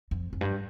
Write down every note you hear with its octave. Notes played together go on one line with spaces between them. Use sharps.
F2
F2
G2